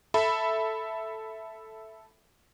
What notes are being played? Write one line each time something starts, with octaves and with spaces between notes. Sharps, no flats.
A4 E5 B5